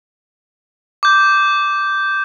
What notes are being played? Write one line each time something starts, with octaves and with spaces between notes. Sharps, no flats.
D6 G6